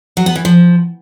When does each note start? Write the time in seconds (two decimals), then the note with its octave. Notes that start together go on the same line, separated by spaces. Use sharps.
0.17 F#3
0.26 B3
0.36 E3
0.45 F3